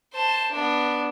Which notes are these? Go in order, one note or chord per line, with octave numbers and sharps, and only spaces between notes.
C5 A5
B3 D4